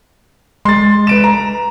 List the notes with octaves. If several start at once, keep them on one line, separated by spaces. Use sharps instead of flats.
G#3 C6 A6
B4 D7 E7
A#5